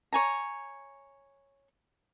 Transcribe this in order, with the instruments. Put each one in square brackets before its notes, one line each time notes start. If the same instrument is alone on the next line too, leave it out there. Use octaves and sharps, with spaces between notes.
[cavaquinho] C#5 G#5 A#5